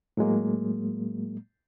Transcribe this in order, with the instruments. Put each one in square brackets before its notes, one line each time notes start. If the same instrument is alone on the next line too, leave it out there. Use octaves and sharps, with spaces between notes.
[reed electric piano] A2 F#3 G#3 A#3